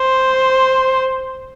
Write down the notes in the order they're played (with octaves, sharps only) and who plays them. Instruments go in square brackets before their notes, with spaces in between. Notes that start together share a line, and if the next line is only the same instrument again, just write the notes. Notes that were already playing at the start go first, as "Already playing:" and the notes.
Already playing: [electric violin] C5